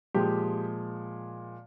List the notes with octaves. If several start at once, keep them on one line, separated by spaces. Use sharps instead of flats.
A#2 F3 G#3 G4